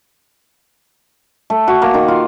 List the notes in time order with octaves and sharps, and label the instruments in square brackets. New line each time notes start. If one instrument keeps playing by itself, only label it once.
[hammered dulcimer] A3
F#4
A#3
D#3
F4